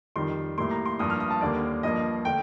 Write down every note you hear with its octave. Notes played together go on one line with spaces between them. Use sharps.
F2 D#3 G3 C6
A2 G3 A#3 C6
A#5
C6
G2 F3 A#3 D#6
F6
D#6
A5
D#2 D3 G3 A#3 D5
G2 F3 A#3 D#5
D3 A3 G5